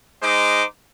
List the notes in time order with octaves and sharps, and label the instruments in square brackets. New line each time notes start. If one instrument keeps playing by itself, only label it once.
[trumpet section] G#3 D#4 C5 D6